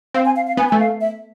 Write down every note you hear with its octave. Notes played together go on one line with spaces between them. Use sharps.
C4 F5
G#5
F5
F5
B3 G#5
A3 G#5
F5
E5